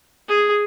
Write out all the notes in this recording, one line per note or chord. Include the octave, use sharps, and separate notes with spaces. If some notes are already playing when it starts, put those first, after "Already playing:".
G#4